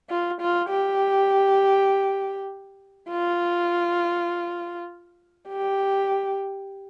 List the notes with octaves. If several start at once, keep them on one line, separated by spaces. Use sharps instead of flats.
F4
F4
G4
F4
G4